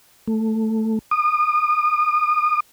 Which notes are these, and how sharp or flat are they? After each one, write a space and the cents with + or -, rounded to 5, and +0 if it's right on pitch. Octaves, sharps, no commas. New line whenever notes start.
A3 +5
D#6 -35